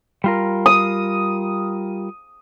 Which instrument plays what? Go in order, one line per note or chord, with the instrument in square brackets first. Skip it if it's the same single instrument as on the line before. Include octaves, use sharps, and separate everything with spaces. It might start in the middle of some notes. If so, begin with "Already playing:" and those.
[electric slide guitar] G3 F4 A#4
[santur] D#6